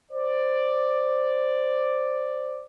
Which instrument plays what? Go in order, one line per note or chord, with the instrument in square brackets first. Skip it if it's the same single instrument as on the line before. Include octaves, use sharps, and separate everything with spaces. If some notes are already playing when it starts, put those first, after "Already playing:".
[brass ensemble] C5 D5